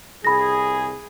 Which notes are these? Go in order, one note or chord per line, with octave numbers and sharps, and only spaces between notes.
C2 G#4 B5 A#6